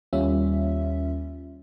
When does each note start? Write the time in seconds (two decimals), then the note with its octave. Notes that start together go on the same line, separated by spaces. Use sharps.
0.13 D#2 G3 A#3 C#4 F4 E5